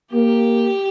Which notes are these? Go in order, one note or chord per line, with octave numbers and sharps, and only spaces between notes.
A#3 G4